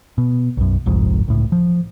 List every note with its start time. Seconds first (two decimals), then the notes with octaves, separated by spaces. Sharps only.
0.18 B2
0.57 B1 F#2
0.86 G1 C2 F2 G#2
1.28 C#2 A2
1.52 F3